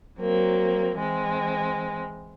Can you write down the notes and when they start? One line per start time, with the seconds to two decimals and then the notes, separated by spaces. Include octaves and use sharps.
0.19 F#3 A#3 C4
0.96 E3 G#3 C4